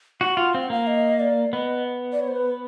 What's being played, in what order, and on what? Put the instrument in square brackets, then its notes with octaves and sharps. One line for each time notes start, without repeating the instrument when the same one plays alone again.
[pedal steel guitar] F#4 [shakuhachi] F#5
[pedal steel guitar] F4
[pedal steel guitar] C4 [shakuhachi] F5
[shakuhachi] F#5
[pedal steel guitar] A#3 [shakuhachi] F5
[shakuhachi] D#5
D5
[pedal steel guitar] B3 [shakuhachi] D#5
[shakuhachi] D5
C#5
C5
B4